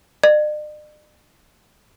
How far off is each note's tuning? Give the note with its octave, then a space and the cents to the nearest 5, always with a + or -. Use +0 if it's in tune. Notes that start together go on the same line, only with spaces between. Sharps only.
D5 +45